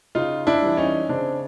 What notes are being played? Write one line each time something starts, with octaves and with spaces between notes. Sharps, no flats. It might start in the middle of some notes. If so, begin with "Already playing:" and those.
C#3 D#4 F4
D4 E4
E3 G3
C#4 D#4
C#3 C4 D4